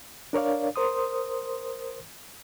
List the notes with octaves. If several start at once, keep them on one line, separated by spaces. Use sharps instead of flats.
D4 A#4 C#5 D5 F5
A#4 C5 C6 D#6